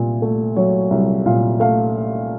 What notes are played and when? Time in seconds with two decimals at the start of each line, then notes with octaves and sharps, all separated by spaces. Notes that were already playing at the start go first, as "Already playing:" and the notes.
Already playing: C2 A#2
0.22 A3
0.56 F#3 C#5
0.91 C2
1.26 A#2 F5
1.60 A3 F5